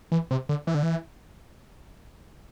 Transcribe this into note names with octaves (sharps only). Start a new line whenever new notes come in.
E3
C3
D3
E3
D3
E3